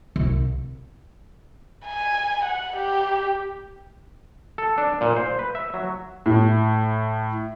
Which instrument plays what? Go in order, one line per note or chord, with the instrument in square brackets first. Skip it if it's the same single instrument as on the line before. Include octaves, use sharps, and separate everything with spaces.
[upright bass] C2
[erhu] G#5
F#5
G4
[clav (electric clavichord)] A4
D4
A#2
C5
B4
E5
F#3
[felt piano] A2